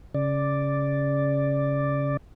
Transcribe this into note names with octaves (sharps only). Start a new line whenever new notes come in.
C#3 D5